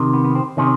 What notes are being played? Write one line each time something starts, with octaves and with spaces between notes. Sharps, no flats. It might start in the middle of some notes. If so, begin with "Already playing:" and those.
Already playing: C3 D#3
B3
B3
C4
C3 D#3 C#4